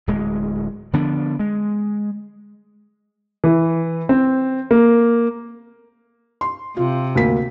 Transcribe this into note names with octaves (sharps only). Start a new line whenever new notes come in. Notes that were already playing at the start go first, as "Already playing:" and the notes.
D1 G#3
D3 F3 B3 D4
G#3
E3
C4
A#3
C6
C3 F4
D2 A#3 B6